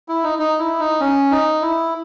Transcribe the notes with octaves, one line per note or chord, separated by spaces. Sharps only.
E4
D#4
D#4
E4
D#4
C#4
D#4
E4